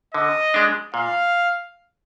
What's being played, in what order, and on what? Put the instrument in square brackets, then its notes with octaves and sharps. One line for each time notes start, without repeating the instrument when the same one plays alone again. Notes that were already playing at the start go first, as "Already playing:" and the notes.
[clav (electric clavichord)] D3 [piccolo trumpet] D#5
[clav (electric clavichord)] G#3 D4
[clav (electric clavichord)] A#2 [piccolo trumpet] F5